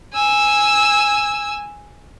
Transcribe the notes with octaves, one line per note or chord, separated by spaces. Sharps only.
G#5 E6